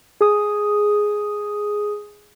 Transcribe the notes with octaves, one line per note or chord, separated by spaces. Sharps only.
G#4 D#6